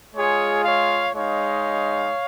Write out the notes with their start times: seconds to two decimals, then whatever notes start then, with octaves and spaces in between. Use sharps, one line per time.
0.14 G#3 F4 G#4 C#5
0.64 C#5 F5
1.13 G#3 D#4 C#5 F5